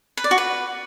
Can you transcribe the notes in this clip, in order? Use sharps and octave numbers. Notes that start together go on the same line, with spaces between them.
B4
D5
F#4
B4